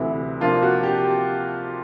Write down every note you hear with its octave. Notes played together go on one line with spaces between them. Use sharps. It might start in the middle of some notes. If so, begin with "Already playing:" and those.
Already playing: D2 C3 E3 E4
C3 F3 A#3 D4 F4
F#4
G4